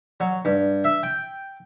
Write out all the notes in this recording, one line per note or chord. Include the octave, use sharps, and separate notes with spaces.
F#3
G2
E5
G5